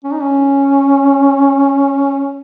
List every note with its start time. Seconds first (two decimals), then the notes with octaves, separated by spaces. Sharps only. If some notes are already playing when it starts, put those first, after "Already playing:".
0.04 C#4
0.13 D#4
0.22 C#4